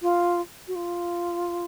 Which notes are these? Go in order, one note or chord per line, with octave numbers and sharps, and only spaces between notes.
F4
F#4
F4